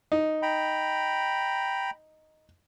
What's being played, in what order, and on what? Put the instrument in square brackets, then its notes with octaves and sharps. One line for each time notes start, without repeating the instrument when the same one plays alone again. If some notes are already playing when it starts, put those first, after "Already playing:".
[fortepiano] D#4
[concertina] G5 A#5 B5